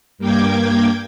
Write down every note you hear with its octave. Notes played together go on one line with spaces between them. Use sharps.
G2 A#3 G5 D6 G#6